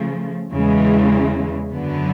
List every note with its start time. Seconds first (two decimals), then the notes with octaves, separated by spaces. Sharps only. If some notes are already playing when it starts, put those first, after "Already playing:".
Already playing: C#3 F3 A3
0.53 E2 C#3 E3 G#3
1.72 F#2 D3 F#3 B3